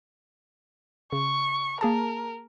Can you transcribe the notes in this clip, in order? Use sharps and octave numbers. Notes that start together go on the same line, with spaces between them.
C#3 C#6
A#3 G#4 A#4 A5